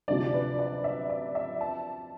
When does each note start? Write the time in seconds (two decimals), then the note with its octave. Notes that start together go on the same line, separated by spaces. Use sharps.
0.08 D2 C3 F3 D5
0.33 B4
0.59 D5
0.84 E5
1.10 D5
1.35 E5
1.61 A5